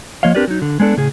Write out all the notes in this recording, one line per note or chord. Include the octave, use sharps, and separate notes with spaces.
F3 A#3 C#5 D#5 F5
C4 D4 G4 A#4 B4 D5
F#3 D#4
D3
G#3 B3 D4 A4
A2 C#3 G#4